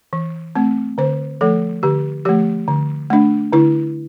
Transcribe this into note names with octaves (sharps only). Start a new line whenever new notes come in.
E3
A3 C4
D3 C5
F3 A3 A4
D3 G4
F3 A3 G4
D3
A3 D4
D3 E4